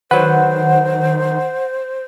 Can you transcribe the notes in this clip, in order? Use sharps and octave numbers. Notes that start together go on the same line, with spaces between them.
D#3 F#3 B4 C5 F#5